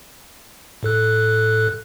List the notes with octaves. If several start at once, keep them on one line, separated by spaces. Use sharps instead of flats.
A2 A4 F#6